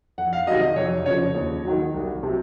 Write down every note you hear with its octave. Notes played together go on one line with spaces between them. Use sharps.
F2 F#5
F5
C3 D#3 F#3 D#5
D#5
F2 C#5
C#3 C#5
F3
D#2
D#3 F#3
C2
C3 F#3